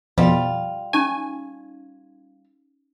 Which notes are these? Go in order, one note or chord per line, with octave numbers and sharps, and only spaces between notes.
F2 B2 G3 F4
C#4 D#4 G4 G#5